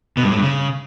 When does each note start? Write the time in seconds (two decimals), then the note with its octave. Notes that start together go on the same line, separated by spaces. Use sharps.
0.17 B2
0.23 G2
0.30 A2
0.36 G2
0.42 C#3